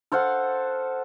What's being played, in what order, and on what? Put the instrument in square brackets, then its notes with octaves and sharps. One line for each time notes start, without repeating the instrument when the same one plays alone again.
[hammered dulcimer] A4 C5 F5 F#5